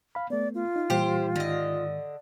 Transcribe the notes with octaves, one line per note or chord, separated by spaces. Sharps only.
F5 B5
A3 B3 D5
F4
D#4
A#2 E3 G3 G4 C5
G#2 D3 D#3 D#5